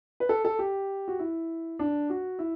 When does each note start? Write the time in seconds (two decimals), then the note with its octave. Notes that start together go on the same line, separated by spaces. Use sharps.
0.20 B4
0.29 A4
0.45 A4
0.59 G4
1.08 F#4
1.19 E4
1.79 D4
2.10 F#4
2.39 E4